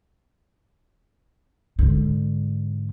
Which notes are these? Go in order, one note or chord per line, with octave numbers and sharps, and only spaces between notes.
G#2 D3